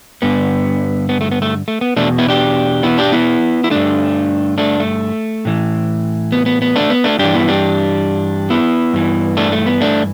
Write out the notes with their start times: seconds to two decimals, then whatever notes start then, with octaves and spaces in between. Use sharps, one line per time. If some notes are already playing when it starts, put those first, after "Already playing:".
0.22 G2 D3 B3
1.09 B3
1.21 A3
1.31 B3
1.42 A3
1.68 A3
1.81 B3
1.96 E2 B2 A3 D4
2.18 B3 E4
2.28 D4 G4
2.83 B3 E4
2.98 D4 G4
3.12 B3 E4
3.64 E4
3.70 G2 D3 A3 D4
4.58 A3 D4
4.80 A3
5.45 A2 E3
6.32 B3
6.46 B3
6.62 B3
6.76 A3 D4
6.90 B3
7.04 A3 D4
7.19 G2 E3 D4 G4
7.34 B3 E4
7.48 D4 G4
8.50 B3 E4
8.93 G2 E3
9.37 A3 D4
9.52 A3
9.66 B3
9.81 A3 D4